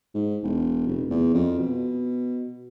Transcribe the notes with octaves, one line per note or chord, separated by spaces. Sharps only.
G#2
E1
F1
E2
F2
B2